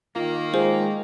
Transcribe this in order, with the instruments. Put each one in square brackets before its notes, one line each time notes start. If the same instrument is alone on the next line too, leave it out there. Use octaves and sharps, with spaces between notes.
[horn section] D#3 A#3 [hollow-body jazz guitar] F4
[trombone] G#3 [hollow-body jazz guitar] F4 G#4 [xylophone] C5